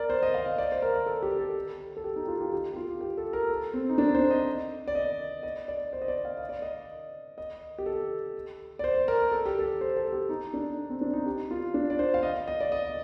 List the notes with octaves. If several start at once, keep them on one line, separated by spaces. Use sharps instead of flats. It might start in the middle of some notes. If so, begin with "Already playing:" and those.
Already playing: A#4 D5
C5
D#5
F5
D#5
D5
C5
A#4
A4
G4
A4
A4
G4
D#4
G4
F4
G4
G4
G4
F4
G4
A4
A#4
A4
C4
D#4
D4
C5
D#5
D5
D#5
D#5
D5
C5
D#5
D5
F5
D#5
D5
D#5
D#5
G4
A4
D5
C5
A#4
A4
G4
A4
C5
A4
G4
D#4
D4
C4
D4
D#4
G4
F4
D4
D5
C5
F5
D#5
D#5
D5
D#5